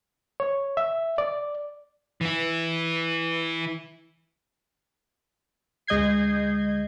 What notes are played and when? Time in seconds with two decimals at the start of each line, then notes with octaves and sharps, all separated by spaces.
0.40 C#5
0.77 E5
1.18 D5
2.21 E3 E4
5.87 D2 G#3 D#5 G6 G#6 C7